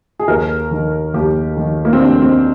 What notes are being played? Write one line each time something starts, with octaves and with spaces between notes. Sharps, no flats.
G#4
D#2 A#4
D#3
D#2 G4
D#3
A#3
C4
D#2 D4
C4